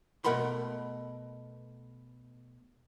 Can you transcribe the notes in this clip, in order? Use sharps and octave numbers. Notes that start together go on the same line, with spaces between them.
B2 A3 A#4 F#5 B5 C6